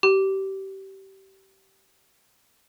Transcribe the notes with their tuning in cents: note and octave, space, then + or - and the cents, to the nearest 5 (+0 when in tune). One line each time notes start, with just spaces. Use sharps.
G4 -25